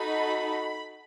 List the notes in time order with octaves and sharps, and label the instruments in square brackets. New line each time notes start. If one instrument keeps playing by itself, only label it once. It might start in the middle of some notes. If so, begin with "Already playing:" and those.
Already playing: [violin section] D#4 F#4 A4 B5